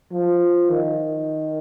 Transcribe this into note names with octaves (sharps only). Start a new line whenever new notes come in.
F3
D#3